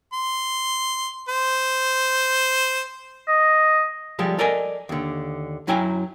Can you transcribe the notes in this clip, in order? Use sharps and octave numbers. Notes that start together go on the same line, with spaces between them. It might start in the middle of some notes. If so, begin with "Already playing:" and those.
C6
C5
D#5
F3 G3 G#3 A4
A4 A#4 D5 D#5 G#5
D#2 D3
F#2 F#3 E4 G5 G#5 A#5